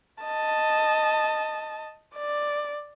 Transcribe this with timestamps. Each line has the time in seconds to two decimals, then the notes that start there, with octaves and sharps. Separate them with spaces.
0.24 D#5 A5
2.16 D5